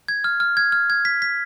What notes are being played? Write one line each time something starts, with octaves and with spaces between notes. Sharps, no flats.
G#6
F6
F6
G#6
F6
G#6
B6
B6